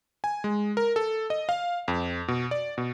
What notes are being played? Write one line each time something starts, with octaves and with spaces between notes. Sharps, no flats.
G#5
G#3
A#4
A4
D#5
F5
F2
B2
D5
B2